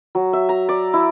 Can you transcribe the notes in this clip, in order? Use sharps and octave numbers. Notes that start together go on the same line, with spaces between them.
F#3
E5
A#5
D5
E4